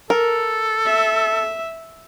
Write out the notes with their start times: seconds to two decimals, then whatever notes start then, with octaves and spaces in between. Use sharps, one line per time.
0.10 A4 A#4
0.86 E5